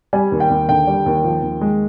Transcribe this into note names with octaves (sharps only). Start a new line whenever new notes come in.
G3 G#5
D#2
G5
D#2
D3 G5
G3
D#2
F3
D#2
G#3